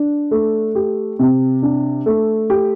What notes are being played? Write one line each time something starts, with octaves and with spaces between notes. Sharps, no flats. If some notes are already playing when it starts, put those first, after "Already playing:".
Already playing: D4
A3
G4
C3
D4
A3
G4